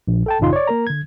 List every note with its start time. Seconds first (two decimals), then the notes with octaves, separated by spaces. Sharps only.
0.08 A#1
0.26 A4 G5 A5
0.40 A1 F#2 C#3 D#4 F4 C6
0.53 C#5 D5
0.67 A#3 A#4 A#5
0.87 D3 G#6